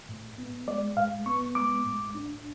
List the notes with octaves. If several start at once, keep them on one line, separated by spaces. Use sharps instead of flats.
A2
B3
G#3 D5
A2 F5
B3 C#6
G#3 D6
A2
D4